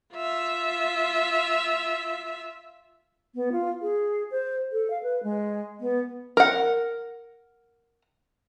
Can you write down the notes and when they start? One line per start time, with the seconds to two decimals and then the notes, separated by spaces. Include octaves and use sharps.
0.15 F4 E5
3.35 B3
3.52 F4
3.82 G#4
4.31 C5
4.72 A4
4.90 F5
5.03 B4
5.23 G#3
5.80 B3
6.37 A#4 F#5